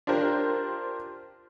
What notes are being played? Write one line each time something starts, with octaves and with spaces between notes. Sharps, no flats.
D4 F4 G4 A#4 C5